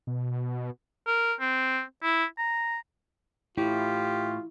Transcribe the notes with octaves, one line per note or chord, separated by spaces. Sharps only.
B2
A#4
C4
E4
A#5
A2 E4 F4 G4